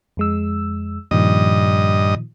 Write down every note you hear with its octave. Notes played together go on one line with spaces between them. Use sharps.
F2 G#3 E6
G2 A#2 D#3 F3 D#5